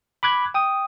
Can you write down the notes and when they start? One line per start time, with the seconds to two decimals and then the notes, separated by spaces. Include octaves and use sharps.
0.23 B5 D6 F#6 G#6
0.54 G5 D#6